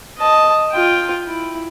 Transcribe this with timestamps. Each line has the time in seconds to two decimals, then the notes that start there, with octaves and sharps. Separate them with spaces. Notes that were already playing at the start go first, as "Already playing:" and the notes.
0.19 D#5 A5
0.72 F4 G5
1.27 E4